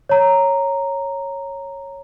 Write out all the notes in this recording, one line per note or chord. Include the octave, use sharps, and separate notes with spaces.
C#5 A#5